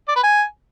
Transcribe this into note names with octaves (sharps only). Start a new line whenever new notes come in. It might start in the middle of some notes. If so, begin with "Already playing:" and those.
D5
B4
G#5